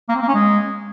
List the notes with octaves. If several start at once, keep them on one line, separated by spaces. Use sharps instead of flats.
A#3
C4
A#3
C#4
G#3